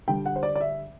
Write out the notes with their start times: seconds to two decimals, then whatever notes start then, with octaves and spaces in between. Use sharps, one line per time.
0.08 D3 G3 D4 G5
0.26 F#5
0.36 C5
0.43 D5
0.56 D5
0.61 E5